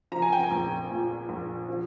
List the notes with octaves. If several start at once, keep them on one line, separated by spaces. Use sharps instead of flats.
F3 A#5
G#5
G5
G#5
A#1
A#2
A#1
F3